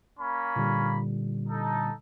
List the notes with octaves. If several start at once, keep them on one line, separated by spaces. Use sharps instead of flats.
A#3 C#4 B5
A#2 D3 G3
D#4 A4